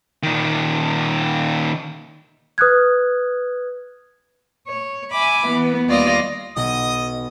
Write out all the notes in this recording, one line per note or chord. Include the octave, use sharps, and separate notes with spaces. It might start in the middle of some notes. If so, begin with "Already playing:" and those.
A#2 D#3
B4 D#6 F6 F#6 G#6
C#5
E5 G#5 B5 D6
E3 B3
D#2 G3 F4 D5 D#5 A#6
B1 D#5 D#6